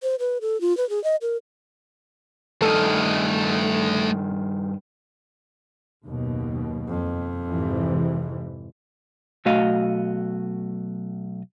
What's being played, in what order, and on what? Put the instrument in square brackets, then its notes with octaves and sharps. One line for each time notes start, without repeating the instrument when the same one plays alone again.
[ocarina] C5
B4
A4
F4
B4
G#4
D#5
A#4
[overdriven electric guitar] G2 D#3 [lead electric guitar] A3 D#5 [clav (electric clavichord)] A4
[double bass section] F#1 D#2 B2
[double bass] F2
[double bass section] G#2 C3 E3
[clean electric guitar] B1 A3 F#4 D#5 F5